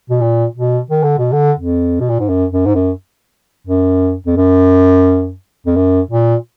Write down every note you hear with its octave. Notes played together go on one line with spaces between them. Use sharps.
B2
A#2
B2
D#3
D3
B2
D3
F2
B2
A#2
G#2
F#2
F#2
G#2
F#2
F#2
F2
F#2
F2
F#2
A#2